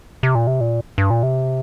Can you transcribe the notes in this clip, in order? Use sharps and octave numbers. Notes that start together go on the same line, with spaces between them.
C3
A#2
C3
A#2
G2
A#2
C3